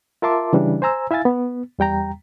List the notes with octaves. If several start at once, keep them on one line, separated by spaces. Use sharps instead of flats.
F4 A#4 E5 A5 C6 D6
C#3 E3 G3 D4
C5 G#5 A#5 E6
E4 E5 F5 G#5 A6
B3
E2 G3 G5 A#5